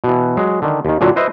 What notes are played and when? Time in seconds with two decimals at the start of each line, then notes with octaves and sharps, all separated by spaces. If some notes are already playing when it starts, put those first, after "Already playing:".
0.04 B2 E3
0.37 F#3 G#3
0.62 D3 D#3
0.85 D#2 D#3
1.01 A#2 D3 F#3 F4 F#4
1.16 E4 B4 C5 D#5 E5